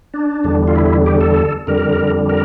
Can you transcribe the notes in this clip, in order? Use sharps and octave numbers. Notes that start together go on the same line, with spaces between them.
D4
E2 D3 G3
F4
E4
G4
A4
F2 D3 G3 A#4
A#4